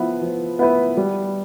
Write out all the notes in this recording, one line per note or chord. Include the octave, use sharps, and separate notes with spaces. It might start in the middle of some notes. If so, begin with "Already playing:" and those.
Already playing: F3 B3 E4 B4
F3
B3 E4 B4
G3